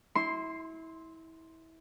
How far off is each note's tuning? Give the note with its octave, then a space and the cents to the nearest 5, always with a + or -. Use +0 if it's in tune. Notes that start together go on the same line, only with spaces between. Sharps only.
E4 -25 C6 +0